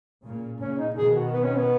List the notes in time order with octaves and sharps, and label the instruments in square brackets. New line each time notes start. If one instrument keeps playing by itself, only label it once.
[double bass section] A#2 C#3
[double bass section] A#2 C#3 [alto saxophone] C#4
[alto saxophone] D#4
[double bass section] B2 D#3 [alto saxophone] G#4
[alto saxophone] F#4
B3
C#4
B3